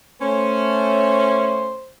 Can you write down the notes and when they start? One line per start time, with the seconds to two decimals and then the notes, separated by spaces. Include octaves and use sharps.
0.21 A3 C#4 C5